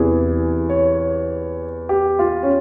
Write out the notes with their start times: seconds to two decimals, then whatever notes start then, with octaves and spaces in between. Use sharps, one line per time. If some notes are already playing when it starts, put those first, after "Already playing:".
Already playing: E2 C3 E3 G#4
0.69 C#5
1.89 G4
2.19 F4
2.43 C#4